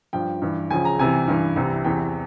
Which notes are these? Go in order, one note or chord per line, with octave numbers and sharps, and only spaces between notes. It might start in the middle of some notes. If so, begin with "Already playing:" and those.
G2 F3 G5
G2 E3
C#2 C#3 F3 G#5
A#5
C2 C3 E3 G#5
G2 E3
C2 C3 E3
E2 C3 E3 G5